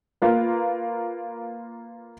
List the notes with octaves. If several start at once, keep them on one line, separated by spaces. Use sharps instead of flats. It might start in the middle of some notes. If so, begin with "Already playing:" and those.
A#3 F4 B4